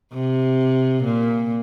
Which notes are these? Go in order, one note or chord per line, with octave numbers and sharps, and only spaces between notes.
C3
A#2